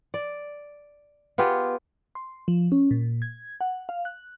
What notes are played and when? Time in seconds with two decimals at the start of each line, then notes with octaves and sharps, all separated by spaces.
0.14 D5
1.38 B3 F4 G4 G#4
2.15 C6
2.48 F3
2.72 C#4
2.91 A#2
3.22 G#6
3.61 F#5
3.89 F5
4.05 F#6